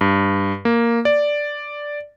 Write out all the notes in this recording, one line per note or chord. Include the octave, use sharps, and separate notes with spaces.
G2
A#3
D5